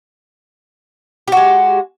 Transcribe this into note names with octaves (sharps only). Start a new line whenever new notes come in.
G#3 F#4 G4